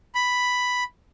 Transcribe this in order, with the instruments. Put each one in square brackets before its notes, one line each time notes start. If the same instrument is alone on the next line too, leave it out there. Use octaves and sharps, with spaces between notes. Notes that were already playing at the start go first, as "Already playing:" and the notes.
[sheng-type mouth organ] B5